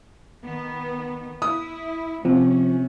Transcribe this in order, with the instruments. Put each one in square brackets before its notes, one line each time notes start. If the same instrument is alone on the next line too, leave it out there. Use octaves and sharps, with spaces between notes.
[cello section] D#3 B3
[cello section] E4 [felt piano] D#6
[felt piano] C3 [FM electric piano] F3 [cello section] C#4